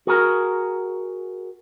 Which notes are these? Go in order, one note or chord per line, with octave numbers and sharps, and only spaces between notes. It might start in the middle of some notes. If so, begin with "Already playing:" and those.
F#4 G#4 A#4